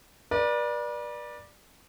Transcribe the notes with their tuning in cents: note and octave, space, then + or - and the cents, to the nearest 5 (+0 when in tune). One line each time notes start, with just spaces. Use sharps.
B4 -40 D5 +10